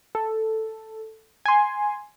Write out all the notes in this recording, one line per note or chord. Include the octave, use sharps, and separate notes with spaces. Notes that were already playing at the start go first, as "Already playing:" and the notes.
A4
G#5 C6